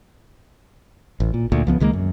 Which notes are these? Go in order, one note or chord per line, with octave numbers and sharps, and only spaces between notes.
A1
A#2
D2 A#2
C#2 F3 B3
C#2 D#3 G#3 A#3
F#2